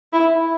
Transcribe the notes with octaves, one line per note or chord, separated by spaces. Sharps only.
E4